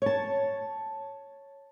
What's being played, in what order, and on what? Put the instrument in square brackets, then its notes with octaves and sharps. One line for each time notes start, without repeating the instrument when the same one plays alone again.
[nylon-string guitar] C#5 A5